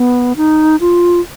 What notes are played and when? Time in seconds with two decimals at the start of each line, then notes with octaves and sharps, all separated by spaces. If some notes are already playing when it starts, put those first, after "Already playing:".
Already playing: B3
0.37 D#4
0.80 F4